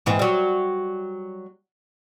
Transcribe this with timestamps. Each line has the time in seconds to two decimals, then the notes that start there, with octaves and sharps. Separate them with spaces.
0.06 G#2 E3 C4
0.19 F#3 G3